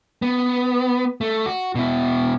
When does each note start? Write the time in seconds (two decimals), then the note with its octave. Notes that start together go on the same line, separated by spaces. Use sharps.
0.22 B3
1.21 A3
1.46 F#4
1.75 B2 E4